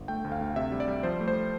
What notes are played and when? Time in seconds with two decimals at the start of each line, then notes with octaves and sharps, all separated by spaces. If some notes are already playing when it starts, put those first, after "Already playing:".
Already playing: G1
0.08 A3 G5
0.24 D2
0.32 F5
0.41 D2
0.56 C3 E5
0.72 G3
0.80 D5
0.88 G3
1.03 F3 C5
1.20 A3
1.28 C5